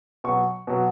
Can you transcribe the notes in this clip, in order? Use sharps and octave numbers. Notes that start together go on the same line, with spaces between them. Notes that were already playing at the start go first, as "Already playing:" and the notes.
B2 F#3 C#6
B2 F#3